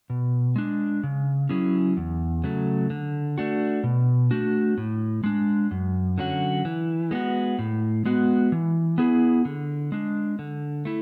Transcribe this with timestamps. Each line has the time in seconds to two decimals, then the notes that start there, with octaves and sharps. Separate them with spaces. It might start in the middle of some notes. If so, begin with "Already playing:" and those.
0.10 B2
0.56 G#3 D4
1.03 C#3
1.49 F#3 C#4 E4 G#4
1.97 E2
2.44 C#3 F#3 A3
2.90 D3
3.38 A3 D4 F#4
3.84 B2
4.31 A3 D4 F#4
4.78 A2
5.24 G#3 D4
5.71 F#2
6.18 D3 F#3 C#4 F#4
6.65 E3
7.11 G#3 B3 F#4
7.59 A2
8.05 G#3 B3 F#4
8.52 E3
8.98 B3 E4 G#4
9.45 D3
9.92 G#3 D4
10.39 D3
10.85 A3 E4